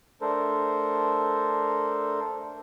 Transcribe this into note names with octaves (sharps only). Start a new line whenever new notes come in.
A3 D4 A4 A#4 C5